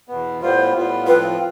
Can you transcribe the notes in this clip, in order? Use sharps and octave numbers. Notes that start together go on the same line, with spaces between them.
E2 B2 B3
A2 G3 B3 F4 C5
A2 G3 B3 F4
A2 F3 C4 F4 B4